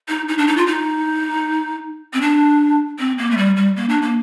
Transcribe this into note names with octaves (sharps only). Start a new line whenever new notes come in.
D#4
D#4
D4
D#4
F4
D#4
C4
D4
C4
A#3
A3
G3
G3
A#3
D4
A#3